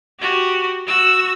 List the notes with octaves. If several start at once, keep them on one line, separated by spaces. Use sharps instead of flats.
F#4 G4
F#4 E6